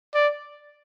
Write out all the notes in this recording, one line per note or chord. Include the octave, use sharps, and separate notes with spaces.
D5